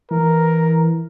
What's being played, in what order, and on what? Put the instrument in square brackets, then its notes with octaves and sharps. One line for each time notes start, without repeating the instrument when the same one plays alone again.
[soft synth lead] E3 [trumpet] A#4